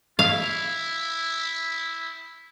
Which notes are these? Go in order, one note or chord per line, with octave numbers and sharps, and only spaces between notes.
E4 F5